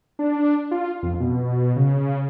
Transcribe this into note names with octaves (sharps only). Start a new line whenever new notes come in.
D4
F4
F2
B2
C#3